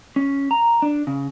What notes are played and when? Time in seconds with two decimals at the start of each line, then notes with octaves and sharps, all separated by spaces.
0.16 C#4
0.51 A#5
0.82 D4
1.07 C#3